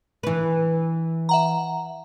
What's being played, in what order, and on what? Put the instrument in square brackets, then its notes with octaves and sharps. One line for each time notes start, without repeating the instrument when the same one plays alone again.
[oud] E3 B4
[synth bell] E5 F#5 A#5